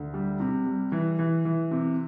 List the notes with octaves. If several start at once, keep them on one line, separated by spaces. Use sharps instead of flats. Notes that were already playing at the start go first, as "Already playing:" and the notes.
Already playing: D2
G3
C3
G3
E3
E3
E3
C3